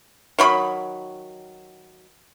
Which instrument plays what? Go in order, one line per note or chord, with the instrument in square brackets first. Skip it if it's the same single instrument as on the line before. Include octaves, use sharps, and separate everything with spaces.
[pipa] D#3 F#3 B5